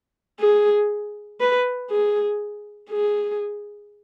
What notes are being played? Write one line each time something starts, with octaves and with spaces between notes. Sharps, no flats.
G#4
B4
G#4
G#4